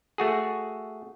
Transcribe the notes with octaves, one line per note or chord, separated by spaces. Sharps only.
A3 F#4 G#4